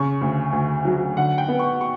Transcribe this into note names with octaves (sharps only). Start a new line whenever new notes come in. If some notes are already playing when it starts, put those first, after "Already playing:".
Already playing: C#3 C#6
D2
D2
F#3
D3 F#5
G5
B3
C#6
C#6